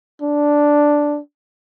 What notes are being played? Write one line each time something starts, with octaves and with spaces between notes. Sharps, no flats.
D4